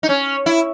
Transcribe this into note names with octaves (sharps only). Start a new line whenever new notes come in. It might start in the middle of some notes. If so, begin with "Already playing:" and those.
D#4
C#4
E4